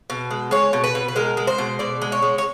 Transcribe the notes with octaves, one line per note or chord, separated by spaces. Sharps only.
B2
G#3
G#3 C#5
B2
B4
B2
B4
G#3 A#4
G#3
C5
B2
B2 D5
G#3
C#5
G#3
C#5